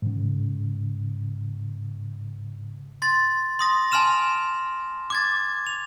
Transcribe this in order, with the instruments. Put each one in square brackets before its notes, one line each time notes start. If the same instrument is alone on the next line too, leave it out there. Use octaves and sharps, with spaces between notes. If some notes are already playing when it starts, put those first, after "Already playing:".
[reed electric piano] G#2 C#3
[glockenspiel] C6 A6
C6 D#6 A#6
G#5 A5 C6 F6 E7 F7
D6 G#6 A6
F7